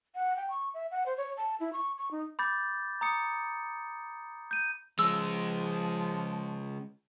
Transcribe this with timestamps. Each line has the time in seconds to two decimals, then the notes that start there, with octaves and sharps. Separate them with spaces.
0.15 F#5
0.36 G5
0.50 C#6
0.74 E5
0.91 F#5
1.06 C5
1.17 C#5
1.37 A5
1.60 E4
1.73 C#6
1.98 C#6
2.11 D#4
2.39 B5 D6 G6 A6
3.01 A#5 D#6 C#7
4.51 G6 D#7
4.99 C#3 F3 G#3 E6